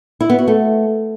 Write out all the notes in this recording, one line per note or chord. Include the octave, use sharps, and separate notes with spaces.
E4
B3
F#4
A3